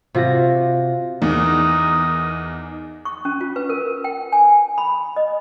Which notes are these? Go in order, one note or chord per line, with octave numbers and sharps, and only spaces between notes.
C3 F4 F#4 A#6
E2 D#4 A#4 D#6
C#6
C#4
F4
B4
A#4
G5
G#5
B5
D#5